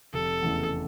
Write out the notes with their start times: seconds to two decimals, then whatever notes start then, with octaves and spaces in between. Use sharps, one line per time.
0.14 F1 A4
0.42 E2 C#3 E3 A3